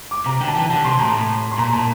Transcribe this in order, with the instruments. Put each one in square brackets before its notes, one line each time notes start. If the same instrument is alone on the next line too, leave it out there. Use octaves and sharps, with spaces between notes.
[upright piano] D6
[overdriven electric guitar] C3 [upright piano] A#5
[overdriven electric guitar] D3 [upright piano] G5
[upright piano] A5
[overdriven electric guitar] E3 [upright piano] G5
[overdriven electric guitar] D3 [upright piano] A5
[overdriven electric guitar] C3 [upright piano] C6
[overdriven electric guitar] A2 [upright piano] A#5
[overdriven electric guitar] A2
[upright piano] C6
[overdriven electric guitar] A#2 [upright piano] A#5
[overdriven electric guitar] A#2 [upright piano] A5